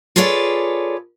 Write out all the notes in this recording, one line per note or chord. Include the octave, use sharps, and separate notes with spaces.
F4 G#4 A4 B4 C#5 D5